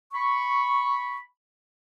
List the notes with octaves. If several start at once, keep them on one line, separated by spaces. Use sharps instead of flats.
B5 C#6